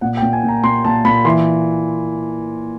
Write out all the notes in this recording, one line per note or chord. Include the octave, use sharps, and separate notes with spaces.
A#2 F#5
G5
A#2
G#5
A#2
A#5
A#2 C6
A#2 A5
A#2 B5
E3 C6